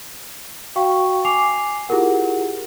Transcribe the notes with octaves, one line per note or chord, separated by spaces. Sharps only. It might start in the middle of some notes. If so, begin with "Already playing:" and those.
F#4 F5 G5 C#6
G#5 D6 C7 F7
E4 F4 G4 G#4 A#4 F#5